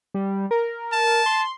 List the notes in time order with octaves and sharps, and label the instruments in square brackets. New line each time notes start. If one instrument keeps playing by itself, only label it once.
[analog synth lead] G3
A#4
[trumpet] A5
[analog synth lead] C6